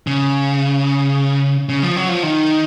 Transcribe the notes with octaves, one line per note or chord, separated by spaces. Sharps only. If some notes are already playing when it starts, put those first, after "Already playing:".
C#3
C#3
F3
F#3
F3
D#3